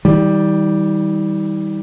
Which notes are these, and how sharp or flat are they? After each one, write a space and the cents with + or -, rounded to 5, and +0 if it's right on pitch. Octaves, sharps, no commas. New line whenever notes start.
D#3 +45 G3 +0